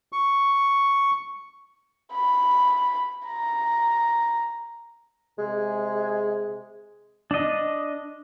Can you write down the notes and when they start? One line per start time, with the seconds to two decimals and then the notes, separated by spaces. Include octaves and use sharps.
0.12 C#6
2.13 B5
3.26 A#5
5.38 C3 G#3 G#4
7.31 D4 D#5